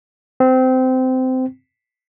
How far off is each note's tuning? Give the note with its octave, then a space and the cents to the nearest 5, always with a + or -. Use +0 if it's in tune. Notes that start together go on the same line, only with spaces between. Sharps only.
C4 -20